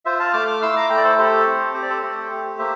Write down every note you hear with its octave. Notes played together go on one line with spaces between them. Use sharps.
F4 C5 E5
F5 A5
A3 D6 F6
D6 F6
E4 C6 E6
A#5 D6
A3 G5 A#5
D5
A4 C5
G4 A4 C5
C4
G4 C5
D5
A4 C5
A3
G4
A#3 C5 E5